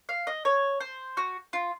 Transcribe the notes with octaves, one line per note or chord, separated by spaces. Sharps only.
F5
D#5
C#5
C5
F#4
F4